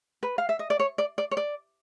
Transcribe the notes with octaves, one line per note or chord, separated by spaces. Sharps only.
B4
F5
E5
D#5
D5
C#5
D5
D5
C#5
D5